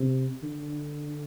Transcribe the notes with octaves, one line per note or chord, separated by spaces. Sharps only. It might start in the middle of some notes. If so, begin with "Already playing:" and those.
Already playing: C3
D3